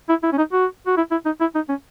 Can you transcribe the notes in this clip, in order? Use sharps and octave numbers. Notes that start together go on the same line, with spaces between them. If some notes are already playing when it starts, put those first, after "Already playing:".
E4
E4
C#4
D#4
F#4
F#4
E4
E4
D#4
E4
D#4
C#4